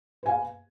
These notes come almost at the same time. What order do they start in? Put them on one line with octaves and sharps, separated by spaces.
B4 G#5 F5